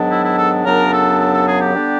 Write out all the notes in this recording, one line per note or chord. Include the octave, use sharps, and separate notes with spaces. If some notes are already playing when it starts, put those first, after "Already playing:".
Already playing: G#2 D#3 F#3 B3 D4
E4
E4
A4
F#2 C#3 F#3 B3 D4 A#4
A4
A4
A4
G#4
G4
D3 G3 B3 D4